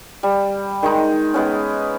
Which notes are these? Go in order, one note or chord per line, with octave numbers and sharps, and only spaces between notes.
G3
D#3 G#3 D#4
G#3 B3 C#4